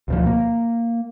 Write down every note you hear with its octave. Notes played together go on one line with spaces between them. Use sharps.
D2 B2 F3
A#3